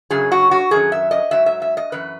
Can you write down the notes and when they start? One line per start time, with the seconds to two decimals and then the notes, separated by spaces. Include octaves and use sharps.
0.10 F#2 C#3 F#3 G#4
0.32 F#4
0.51 F#4
0.71 F#2 D#3 F#3 G#4
0.92 E5
1.11 D#5
1.31 G#2 F#3 E5
1.46 E5
1.62 E5
1.77 D#5
1.92 F#2 E3 B4